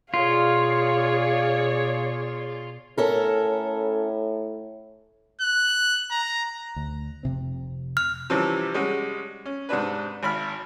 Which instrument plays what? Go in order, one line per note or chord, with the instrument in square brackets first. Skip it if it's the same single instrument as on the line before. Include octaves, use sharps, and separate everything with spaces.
[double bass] B2 [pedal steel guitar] F4 [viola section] G#4 C#5 D5 [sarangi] F5
[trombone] A2 [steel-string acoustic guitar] C#4 A4 A#4
[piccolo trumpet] F#6
A#5
[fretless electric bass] D2
F1 C3 C4
[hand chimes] F6
[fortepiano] C3 E3 F3 G3 C#4
G3 G#3 C#4 F#4
C#4
G#2 C3 D4 B4
G#1 B5 F6